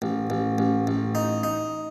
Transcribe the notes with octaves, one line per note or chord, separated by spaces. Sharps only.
A1
A1
A1
A1
D#4
D#4